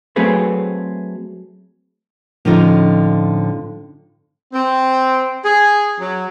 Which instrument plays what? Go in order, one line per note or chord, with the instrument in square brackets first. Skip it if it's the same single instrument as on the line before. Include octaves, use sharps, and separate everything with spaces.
[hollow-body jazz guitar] F#3 A3 C4 G#4 B4
[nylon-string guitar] A2 D3 F3 C#4 D#4 F4
[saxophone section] C4
G#4
F#3